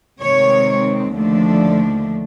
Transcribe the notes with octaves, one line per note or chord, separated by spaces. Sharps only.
C3 D#3 G#3 C4 C#5
D#2 D3 F3 A3 D4